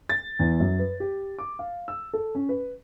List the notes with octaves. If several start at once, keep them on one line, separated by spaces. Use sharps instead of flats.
A6
E2
F#2
B4
G4
D6
F5
E6
A4
C#4
B4